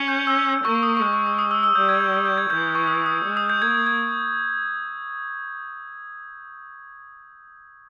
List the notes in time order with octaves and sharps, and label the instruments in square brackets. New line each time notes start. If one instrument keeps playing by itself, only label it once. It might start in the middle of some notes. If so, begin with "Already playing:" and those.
Already playing: [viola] C#4
[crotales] G6
E6
[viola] A#3 [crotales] C#6
[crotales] D#6
C#6
[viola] G#3 [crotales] D#6
[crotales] C#6
D#6
D#6
E6
E6
[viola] G3 [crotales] G6
[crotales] G#6
G6
E6
G6
G#6
[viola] E3 [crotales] G6
[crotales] C#6
D#6
D#6
[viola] G#3
[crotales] D#6
G6
[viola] A#3 [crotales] G#6
[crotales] G#6
G#6